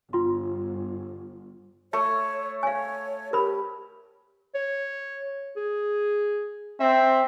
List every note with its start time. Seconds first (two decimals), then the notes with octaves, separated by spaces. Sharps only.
0.13 G1 F4 C6
1.93 A3 C#5
2.63 C#5 F5 G#5
3.33 G4 A#4 B5
4.55 C#5
5.57 G#4
6.80 C4 E5